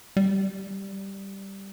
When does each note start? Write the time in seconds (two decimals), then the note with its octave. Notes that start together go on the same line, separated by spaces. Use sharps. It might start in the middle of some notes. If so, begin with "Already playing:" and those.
0.17 G3